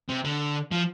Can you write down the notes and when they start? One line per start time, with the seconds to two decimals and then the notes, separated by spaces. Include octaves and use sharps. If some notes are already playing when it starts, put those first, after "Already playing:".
0.09 C3
0.25 D3
0.71 F3